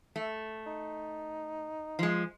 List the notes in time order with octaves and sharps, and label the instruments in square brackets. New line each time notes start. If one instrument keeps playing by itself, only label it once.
[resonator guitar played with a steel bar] A3
[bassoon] D#4
[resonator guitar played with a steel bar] F3 G#3